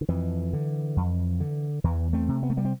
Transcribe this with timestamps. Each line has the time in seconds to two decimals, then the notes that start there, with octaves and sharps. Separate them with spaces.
0.01 D3
0.08 F2 E3
0.53 D3
0.97 F2
1.40 D3
1.84 E2 E3
2.13 A3 C4
2.28 C3
2.43 B3
2.50 A3
2.57 G3 B3
2.65 C4